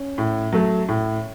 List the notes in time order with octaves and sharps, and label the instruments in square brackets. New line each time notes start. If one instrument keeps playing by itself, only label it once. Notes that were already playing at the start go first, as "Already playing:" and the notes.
Already playing: [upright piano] C#4
A2
F#3 A3
A2